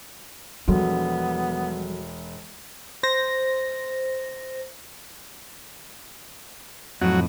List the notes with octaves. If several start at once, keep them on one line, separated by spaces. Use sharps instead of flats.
E1 F3 G3 B3 F#4 A4 C6
C5 A#6
F2 A2 F#3